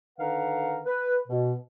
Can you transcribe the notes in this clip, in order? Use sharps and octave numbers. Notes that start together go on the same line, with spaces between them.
D3 D#3 B4 F5 F#5 A#5
B4
B2